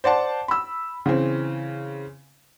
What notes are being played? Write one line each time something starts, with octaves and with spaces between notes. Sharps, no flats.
C5 D5 F#5 A5
B5 E6
C#3 E3 C4